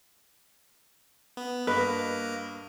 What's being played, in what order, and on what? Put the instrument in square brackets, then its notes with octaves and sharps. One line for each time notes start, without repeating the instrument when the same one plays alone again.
[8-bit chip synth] B3
[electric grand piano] G2 D#5 F#6 [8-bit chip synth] A#3 A#4 [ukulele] B4